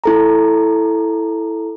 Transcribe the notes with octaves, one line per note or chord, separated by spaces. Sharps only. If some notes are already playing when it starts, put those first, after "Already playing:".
E4 A4 A#5